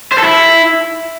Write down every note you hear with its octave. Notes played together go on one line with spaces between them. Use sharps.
C5
A4
E4